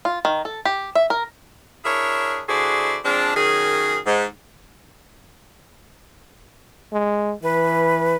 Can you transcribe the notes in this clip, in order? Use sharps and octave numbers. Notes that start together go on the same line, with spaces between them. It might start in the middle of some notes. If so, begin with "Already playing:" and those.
F4
D#3
A4
G4
E5
A#4
D4 E4 G#4 A#4 C#5
D3 E4 F#4 G#4 C5 D5
F3 G#3 C4 D4
F#2 D#3 C#4 G#4
G#2
G#3
E3 B4